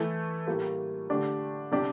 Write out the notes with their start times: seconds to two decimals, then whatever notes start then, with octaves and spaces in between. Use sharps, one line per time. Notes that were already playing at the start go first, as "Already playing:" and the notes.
Already playing: E3 A3 E4 A4
0.47 A2 G3 A#3 F4
1.10 D3 A3 D4 G4
1.72 C3 G3 D4 G4